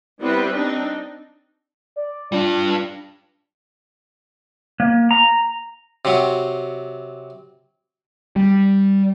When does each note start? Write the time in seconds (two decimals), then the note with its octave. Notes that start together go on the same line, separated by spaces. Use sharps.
0.21 G3 B3 C4 E4 G4 B4
0.53 C4 D4 D#4
1.96 D5
2.32 G3 D4 F4
4.80 A#3
5.11 A#5
6.05 C3 F#3
8.36 G3